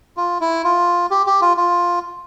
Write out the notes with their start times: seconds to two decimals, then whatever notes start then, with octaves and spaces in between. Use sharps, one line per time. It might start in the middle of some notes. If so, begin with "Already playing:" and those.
0.17 F4
0.41 E4
0.64 F4
1.11 G4
1.26 G4
1.42 F4
1.57 F4